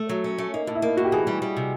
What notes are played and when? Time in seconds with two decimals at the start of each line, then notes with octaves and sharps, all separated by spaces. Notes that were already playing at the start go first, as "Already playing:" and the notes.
Already playing: A3
0.09 F#3
0.24 C#4
0.38 A3
0.54 A#3 D#4
0.67 A2
0.75 E4
0.82 A#3 D#4
0.97 A2 F#4
1.04 G4
1.12 E3 G#4
1.27 G3
1.42 G3
1.57 C3